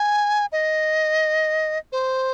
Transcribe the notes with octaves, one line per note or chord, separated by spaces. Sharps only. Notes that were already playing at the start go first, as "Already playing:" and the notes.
Already playing: G#5
D#5
C5